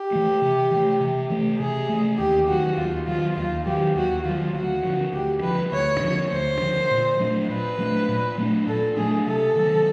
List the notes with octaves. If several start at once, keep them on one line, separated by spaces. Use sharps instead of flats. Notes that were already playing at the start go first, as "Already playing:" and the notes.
Already playing: G4
E3 A3
C3
E3 A3
C3
E3 A3
C3 G#4
E3 A3
D#2 G4
D#3 F#3 F#4
D#2 F4
D#3 F#3 F4
D#2 F4
D#3 F#3 G4
D#2 F#4
D#3 F#3 F4
D2 F#4
D3 F3
D2 G4
D3 F3 B4
D2 C#5
D3 F3
D2 C5
D3 F3
A#2
F#3 A3 D4
A#2 B4
F#3 A3 D4
A#2
F#3 A3 D4
A#2 A4
F#3 A3 D4 G#4
C3 A4
D#3 F#3